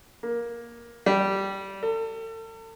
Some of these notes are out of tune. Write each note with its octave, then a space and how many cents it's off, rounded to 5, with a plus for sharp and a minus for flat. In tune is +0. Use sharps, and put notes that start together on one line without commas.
A#3 +15
G3 -10
A4 +40